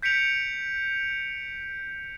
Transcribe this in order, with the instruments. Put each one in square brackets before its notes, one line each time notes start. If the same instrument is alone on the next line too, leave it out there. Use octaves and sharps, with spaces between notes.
[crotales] G6 B6 C#7 D7 F7